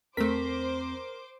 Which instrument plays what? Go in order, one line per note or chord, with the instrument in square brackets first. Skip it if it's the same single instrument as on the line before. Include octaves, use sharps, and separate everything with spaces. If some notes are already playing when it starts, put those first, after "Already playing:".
[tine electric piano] E2 C4 [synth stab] A3 B6 [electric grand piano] A#4 [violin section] C5 D6